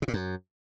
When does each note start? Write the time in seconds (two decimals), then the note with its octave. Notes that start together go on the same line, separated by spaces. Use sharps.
0.02 C3
0.08 A#2
0.13 F#2